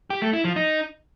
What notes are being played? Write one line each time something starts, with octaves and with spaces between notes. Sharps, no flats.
G4
A3
E4
F3
D#4